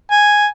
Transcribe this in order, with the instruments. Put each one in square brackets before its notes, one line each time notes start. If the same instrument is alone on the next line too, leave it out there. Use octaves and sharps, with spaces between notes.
[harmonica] G#5